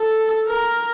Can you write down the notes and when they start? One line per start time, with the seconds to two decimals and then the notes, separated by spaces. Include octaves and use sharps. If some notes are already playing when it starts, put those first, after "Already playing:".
Already playing: A4
0.48 A#4